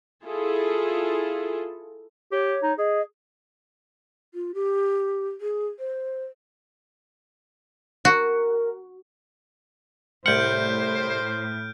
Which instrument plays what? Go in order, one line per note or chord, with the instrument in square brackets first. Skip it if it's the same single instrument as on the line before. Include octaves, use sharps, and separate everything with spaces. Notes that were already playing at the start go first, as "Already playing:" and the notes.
[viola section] E4 F4 G#4 A4
[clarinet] G4 [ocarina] C#5
[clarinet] D#4
[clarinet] G#4 [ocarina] D#5
[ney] F4
G4
G#4
C5
[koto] F#4 [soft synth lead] A#4
[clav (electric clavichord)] C2 F#5 [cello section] A2 [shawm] C5 [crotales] F6 G6 D7